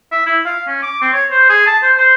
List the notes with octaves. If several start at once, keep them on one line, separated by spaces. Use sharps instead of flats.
E5
E4
F5
C#4
D6
C4
C#5
C5
G#4
A5
C5
C5